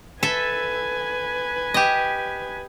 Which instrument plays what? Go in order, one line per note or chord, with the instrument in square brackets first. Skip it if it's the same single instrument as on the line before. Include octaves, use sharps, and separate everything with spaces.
[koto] A4 E5 [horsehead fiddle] B4 G#5
[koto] G4 D#5